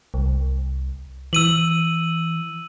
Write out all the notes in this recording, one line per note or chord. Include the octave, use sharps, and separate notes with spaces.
C2
E3 E6 D#7 F#7